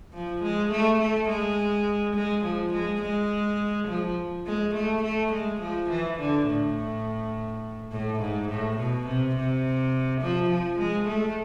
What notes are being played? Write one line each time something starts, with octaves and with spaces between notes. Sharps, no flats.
F3
G#3
A3
A3
G#3
G#3
F3
G#3
G#3
F3
G#3
A3
A3
G#3
F3
E3
D3
A2
A2
G#2
A2
B2
C3
C3
F3
F3
G#3
A3